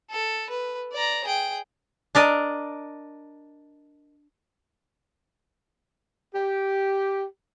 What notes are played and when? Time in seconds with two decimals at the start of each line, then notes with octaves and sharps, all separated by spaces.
0.11 A4
0.50 B4
0.93 D5 A#5
1.25 G#4 G5
2.15 D4 A#4 D5 D#5
6.33 G4